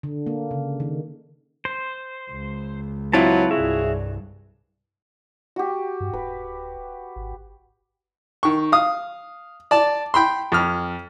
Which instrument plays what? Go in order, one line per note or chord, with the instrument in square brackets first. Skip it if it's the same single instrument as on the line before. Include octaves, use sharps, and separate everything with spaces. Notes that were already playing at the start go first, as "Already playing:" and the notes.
[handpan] D3
A#3
C#3
D#3
[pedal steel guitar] C5
[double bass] C#2
[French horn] F#3 [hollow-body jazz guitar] C4 E4 F4 [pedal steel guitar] B4 C#5 A5
[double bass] C2 G2 [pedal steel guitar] F#4 C#5 E5 [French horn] G#4
[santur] F#4 G4
[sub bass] G2
[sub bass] D1 [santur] B4
[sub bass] G#1
[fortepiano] D#3 C#6
F5 D#6
D5 A5
G5 B5 C6
F2 F6